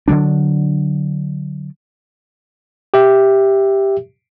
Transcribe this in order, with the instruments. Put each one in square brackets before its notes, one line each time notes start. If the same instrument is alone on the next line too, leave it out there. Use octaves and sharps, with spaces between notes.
[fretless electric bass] D3 E3 F#3 D4
[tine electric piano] G4 E5